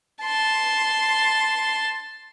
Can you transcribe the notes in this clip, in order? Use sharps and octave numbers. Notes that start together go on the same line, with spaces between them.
A5 C6